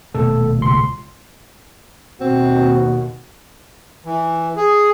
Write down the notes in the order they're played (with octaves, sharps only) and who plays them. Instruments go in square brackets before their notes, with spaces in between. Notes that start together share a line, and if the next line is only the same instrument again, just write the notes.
[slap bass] D#1 B2 A3 [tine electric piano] A4
[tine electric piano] C#2 C6
[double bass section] D#2 B2 [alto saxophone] C4 [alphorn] F#4
[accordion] E3
G#4